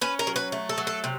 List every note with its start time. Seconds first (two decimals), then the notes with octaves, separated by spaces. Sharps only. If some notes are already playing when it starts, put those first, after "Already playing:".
0.01 C#4 B4
0.19 A#4
0.27 F#3
0.36 B4
0.52 A3
0.69 A4
0.78 F#3
0.87 A4
1.04 C3